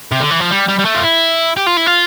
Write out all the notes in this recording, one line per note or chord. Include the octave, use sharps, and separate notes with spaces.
C3
D3
E3
F3
G3
G3
G3
A3
F4
E4
G4
F4
E4
F4